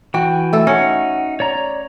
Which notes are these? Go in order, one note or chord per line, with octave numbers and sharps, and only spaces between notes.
E3 F#4 G5
A3 A4
C#4 D#4 F#5
C#5 D5 A#5